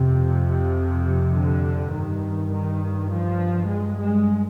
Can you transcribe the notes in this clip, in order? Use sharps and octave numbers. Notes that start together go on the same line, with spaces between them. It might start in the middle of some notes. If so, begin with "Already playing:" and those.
Already playing: F2 C3
F3
D3
G2 D#3
D#3
F3
G#3
G#3